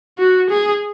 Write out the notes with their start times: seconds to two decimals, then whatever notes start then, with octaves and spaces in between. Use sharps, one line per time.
0.18 F#4
0.50 G#4